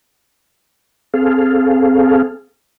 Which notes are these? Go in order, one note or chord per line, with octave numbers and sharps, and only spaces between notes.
C4 G#4 A4 F5